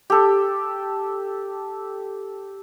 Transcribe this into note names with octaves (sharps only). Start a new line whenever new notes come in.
G4 A4